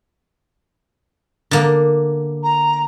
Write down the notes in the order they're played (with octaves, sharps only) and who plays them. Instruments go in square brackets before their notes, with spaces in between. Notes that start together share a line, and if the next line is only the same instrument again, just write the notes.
[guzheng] D3 A#3
[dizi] A#5